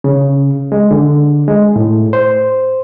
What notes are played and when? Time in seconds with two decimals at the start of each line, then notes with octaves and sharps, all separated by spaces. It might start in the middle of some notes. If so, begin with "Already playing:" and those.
0.04 C#3
0.72 G#3
0.91 D3
1.48 G#3
1.76 A2
2.13 C5